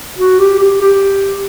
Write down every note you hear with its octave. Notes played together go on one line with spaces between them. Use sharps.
F#4
G4
G4
G4